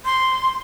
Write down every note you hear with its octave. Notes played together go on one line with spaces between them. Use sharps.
C6